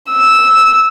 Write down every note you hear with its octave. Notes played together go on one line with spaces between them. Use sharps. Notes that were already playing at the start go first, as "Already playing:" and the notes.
E6